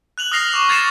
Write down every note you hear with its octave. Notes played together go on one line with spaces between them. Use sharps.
F#6 F7 F#7
D#6 F6 A#6 C7 F7
C#6 D6 F7
G#6 A6 C7 C#7 E7